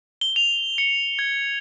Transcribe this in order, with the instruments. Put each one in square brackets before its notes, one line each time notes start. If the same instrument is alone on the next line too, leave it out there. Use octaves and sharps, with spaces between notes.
[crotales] G7
F7
C#7
G#6